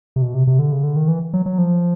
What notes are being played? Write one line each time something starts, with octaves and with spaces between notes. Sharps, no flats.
C3
B2
C3
C3
D3
C#3
D3
D#3
E3
F#3
F#3
F3